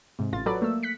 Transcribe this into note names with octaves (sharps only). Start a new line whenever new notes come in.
G#2 C3
A1 F4 A6
F#3 A4 B4 D5
A3 A#3 E6
F#6 B6 C#7